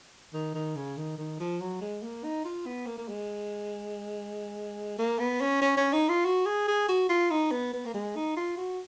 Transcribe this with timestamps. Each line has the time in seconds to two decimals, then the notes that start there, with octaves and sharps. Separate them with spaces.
0.33 D#3
0.54 D#3
0.76 C#3
0.97 D#3
1.18 D#3
1.40 F3
1.61 F#3
1.81 G#3
2.03 A#3
2.24 D#4
2.45 F4
2.66 B3
2.87 A#3
2.98 A#3
3.08 G#3
4.99 A#3
5.19 B3
5.41 C#4
5.62 C#4
5.77 C#4
5.93 D#4
6.09 F4
6.25 F#4
6.46 G#4
6.68 G#4
6.88 F#4
7.09 F4
7.31 D#4
7.51 B3
7.74 B3
7.86 A#3
7.94 G#3
8.16 D#4
8.37 F4
8.57 F#4